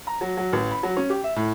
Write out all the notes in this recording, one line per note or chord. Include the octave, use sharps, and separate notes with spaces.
A#5
F#3
F#3
A1
B5
F#3
C#4
G4
E5
A2